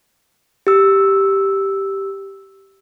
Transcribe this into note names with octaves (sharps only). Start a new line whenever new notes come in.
G4 E6